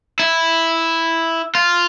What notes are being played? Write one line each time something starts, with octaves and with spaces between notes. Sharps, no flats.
E4
F4